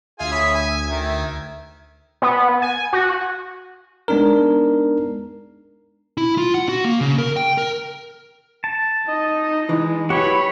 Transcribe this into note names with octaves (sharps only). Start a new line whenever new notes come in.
D2 F4 G#4 E5 G#5 G#6
C#5 B5 D#6
G#5
D#3
B3
G#5
F#4
G#3 B3 D4 D#4 A#4
E4
F4
F#5
F#4
A#3
C#3
A#4
G5
A#4
A5
D#4 D#5
E3 G#3
F#3 E4 F#4 G4 B4 C#5 B5